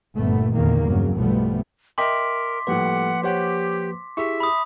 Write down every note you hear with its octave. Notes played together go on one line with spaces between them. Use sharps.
G1 G2 A#2 A3 B3
A#1 E2 A#2 D3 D#3 A#3
G2 C#3 F#3
B1 G2 F3 G3 A3 B3
A#4 D#5 E5 G5 C6 D6 B6
A2 F3 G3 A#3 B4 F#5
G4 C5 C#5 F#5
E4 G4 G#4 E5 C#6
B5 D#6